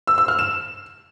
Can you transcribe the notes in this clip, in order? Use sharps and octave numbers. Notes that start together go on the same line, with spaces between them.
E6
E6
F6
E7